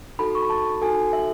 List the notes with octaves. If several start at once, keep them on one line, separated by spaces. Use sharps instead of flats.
D#4 F#4 A4 B5
C#6
B5
A5
D#4 F#4 A4 G#5
E5